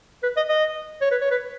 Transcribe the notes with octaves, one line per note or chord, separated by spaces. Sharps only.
B4
D#5
D#5
C#5
B4
C#5
B4